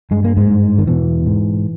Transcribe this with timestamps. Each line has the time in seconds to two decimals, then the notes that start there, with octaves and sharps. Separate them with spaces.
0.11 G2 G#3
0.24 A#3
0.37 G#2 G#3
0.50 G2
0.78 D#3
0.87 E2 B2 E3
1.27 G#2